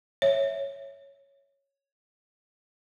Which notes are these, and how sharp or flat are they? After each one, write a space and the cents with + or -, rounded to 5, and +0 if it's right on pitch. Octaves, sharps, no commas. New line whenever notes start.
C#5 +0 E5 +0